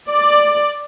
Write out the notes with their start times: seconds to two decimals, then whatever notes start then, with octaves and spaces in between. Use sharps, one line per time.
0.10 D5